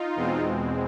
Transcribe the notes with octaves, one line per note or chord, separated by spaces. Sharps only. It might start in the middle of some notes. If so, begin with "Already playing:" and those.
Already playing: D#4 F4
E2 B2 G#3 C4